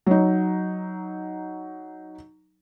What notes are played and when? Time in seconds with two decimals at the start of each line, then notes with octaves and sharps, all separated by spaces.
0.07 F#3 D#4